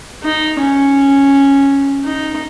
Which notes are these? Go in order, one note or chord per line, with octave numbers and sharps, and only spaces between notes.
D#4
C#4
D#4